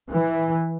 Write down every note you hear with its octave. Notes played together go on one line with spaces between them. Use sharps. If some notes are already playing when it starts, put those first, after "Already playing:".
E3